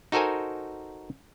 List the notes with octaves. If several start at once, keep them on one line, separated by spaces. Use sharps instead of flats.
D#4 F#4 A4 A#4 C5 G#5